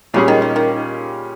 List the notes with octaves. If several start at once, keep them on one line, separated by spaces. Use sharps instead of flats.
A#2 C#3 G3 C#4 G#4
D#3
D#3
D#3